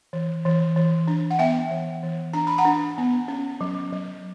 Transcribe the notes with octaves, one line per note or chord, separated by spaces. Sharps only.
E3
E3
E3
D4
F#5
B3 E5 G5
E3
E3
D4 A#5
B5
F#5 A#5
D4
B3
C#4
F#3
F#3